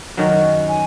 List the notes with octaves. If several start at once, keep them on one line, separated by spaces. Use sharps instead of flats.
F#2 D#3 F#3 C#4 F#4
G#5